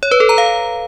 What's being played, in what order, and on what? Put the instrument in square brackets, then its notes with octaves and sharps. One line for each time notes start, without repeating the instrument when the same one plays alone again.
[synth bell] C#5
B4
A4
A#5
F5